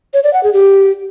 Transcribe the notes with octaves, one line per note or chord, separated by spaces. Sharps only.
C#5
D5
F#5
G#4
G4